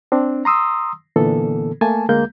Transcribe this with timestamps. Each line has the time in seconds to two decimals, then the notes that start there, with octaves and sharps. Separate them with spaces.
0.12 C4 D4
0.45 A#5 C6 D#6 E6
1.16 A#2 D3 E3 A#3 B3 A4
1.81 A3 A#3 G#5 A5
2.09 D2 G#3 A#3 G6